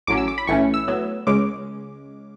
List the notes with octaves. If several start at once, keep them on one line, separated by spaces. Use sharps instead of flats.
A1 A2 F#3 C#4 D6
E6
D6
B5
B1 A2 E3 A3 C#4 C#6
E6
A2 F#3 B3
C#2 C#3 G#3 C#4 D6